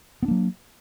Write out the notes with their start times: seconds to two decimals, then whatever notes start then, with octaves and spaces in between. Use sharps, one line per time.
0.23 B3
0.25 D4
0.28 A#3
0.31 F#3